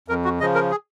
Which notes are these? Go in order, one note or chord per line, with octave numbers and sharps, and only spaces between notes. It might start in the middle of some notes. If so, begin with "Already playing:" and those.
F2 A#4
F#4
C#3 F3 D#5
A#4
G#4